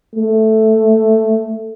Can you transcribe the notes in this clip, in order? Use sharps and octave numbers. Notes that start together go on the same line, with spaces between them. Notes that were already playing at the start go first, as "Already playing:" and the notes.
A3